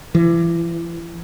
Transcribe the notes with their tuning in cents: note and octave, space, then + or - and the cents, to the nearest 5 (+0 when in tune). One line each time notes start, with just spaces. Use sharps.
E3 +35